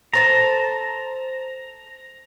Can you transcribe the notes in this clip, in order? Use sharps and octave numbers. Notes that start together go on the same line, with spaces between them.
A4 C5 A5 A#5